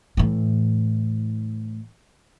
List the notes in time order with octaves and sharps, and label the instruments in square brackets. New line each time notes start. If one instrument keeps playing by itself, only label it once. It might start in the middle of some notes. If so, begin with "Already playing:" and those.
[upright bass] A2 E3